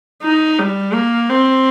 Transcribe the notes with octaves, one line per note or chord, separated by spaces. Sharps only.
D#4
G3
A#3
C4